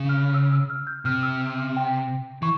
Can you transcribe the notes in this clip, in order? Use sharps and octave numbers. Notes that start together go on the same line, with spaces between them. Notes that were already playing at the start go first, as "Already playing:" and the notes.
Already playing: C#3
F6
E6
E6
F6
G6
C3 F6
E6
F6
G5
E3 C#6